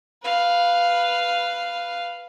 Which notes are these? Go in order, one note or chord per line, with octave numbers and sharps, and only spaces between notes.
B4 F5